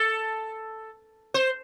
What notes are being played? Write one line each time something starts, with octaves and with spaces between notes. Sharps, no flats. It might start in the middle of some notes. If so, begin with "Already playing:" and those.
Already playing: A4
C5